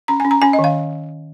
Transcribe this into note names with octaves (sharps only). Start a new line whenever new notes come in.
C#4 A#5
C#4 G#5
A#5
C#4 G#5
D#5
D#3
F5